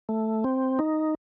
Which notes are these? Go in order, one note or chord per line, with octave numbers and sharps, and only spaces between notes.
A3
C4
D#4